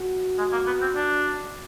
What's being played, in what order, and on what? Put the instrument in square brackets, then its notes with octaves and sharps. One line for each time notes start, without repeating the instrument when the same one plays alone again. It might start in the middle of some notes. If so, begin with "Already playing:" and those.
Already playing: [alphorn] F#4
[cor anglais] G#3
A#3
B3
C4
D4